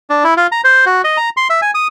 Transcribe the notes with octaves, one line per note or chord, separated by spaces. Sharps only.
D4
E4
F4
A#5
C5
F#4
D#5
A#5
C6
E5
G#5
D#6